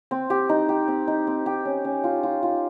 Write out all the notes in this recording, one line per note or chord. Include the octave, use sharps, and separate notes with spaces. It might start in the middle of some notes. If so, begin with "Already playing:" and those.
C4
G4
D#4
G4
C4
D#4
C4
G4
C#4
C#4
F4
F4
F4